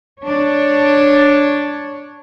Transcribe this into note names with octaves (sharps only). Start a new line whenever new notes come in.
D4 C#5